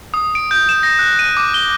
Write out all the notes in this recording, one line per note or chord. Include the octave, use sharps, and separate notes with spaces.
D#6
D7
G6
E7
A#6
F#6
D#7
D6
G7